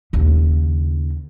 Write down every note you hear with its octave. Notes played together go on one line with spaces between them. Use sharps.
D#2 C#3